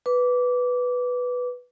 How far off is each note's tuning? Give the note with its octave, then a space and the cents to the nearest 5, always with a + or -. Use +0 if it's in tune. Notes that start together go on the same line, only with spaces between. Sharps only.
B4 +0 D6 -20